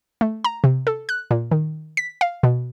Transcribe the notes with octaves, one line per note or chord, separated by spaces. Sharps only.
A3
A#5
C3
A4
F#6
A#2
D#3
B6
F5
B2